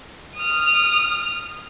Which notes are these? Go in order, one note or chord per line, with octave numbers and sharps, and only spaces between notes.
D#6 F6